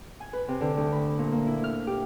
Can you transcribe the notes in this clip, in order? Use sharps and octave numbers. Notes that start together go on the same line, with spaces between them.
G#5
B4
C3
D3
D2
B5
A#2
A#3
E4
F6
G4